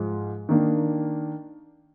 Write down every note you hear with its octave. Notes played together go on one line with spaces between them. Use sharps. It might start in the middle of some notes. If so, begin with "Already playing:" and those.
Already playing: G#2 F3 G#3
D#3 A#3 D4